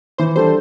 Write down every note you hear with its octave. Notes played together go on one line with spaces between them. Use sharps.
E3 C5
G3 D4 A4 C5